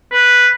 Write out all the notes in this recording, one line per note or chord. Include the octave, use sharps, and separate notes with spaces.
B4